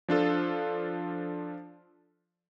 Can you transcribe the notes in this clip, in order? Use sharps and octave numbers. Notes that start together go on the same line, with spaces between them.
F3 D4 F4 A4